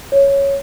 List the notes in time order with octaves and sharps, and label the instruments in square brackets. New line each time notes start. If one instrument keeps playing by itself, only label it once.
[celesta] C#5